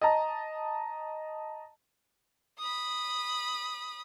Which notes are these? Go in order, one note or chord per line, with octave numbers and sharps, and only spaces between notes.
D#5 A5 A#5
B5 D#6